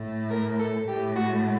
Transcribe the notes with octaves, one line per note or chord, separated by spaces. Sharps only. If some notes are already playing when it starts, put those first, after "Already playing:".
Already playing: A2 A3
A#4
A4
A2 A3 G4
F#4